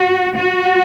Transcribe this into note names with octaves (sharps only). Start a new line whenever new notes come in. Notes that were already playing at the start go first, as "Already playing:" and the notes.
Already playing: F#4
F#4